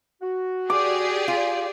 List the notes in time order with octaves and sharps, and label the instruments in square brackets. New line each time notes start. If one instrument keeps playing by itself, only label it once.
[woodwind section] F#4
[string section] G4 G#4 D5 [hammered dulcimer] D6
[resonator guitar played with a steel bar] F4